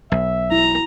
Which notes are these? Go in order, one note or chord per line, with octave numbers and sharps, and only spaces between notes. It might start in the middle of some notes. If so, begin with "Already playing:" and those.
B1 E5
E4 A#5